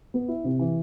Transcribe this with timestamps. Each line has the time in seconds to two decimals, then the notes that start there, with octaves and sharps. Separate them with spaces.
0.14 B3
0.28 E4
0.44 C3
0.59 E3